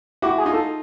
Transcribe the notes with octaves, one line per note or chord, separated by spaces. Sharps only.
E4 F#4 G4
G#4
D#4 F4
A4